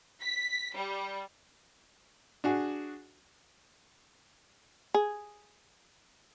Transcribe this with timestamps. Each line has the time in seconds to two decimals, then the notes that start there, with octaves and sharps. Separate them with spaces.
0.22 B6
0.75 G3
2.44 D4 F#4 G#4
4.94 G#4